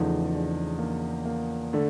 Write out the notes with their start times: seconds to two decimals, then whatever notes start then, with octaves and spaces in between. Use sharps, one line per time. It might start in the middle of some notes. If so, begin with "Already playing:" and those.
Already playing: E2 C#3 F3 A3 D#4
0.33 D4
0.79 A#3
1.26 A#3
1.73 D3 A3